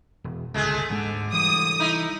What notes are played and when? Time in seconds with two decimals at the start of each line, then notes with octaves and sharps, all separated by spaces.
0.24 E1
0.54 G1 C#2 G#3 A3 G#4
0.90 D2 G#2 D3 G#3
1.33 E3 G3 D#6
1.80 D#4 E4